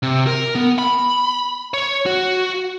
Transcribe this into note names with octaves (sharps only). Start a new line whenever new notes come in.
C3
A#4
B3
B5
C#5
F#4